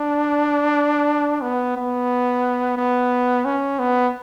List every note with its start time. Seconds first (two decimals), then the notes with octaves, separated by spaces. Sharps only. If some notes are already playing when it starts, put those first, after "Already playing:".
Already playing: D4
1.42 B3
1.76 B3
2.77 B3
3.45 C#4
3.79 B3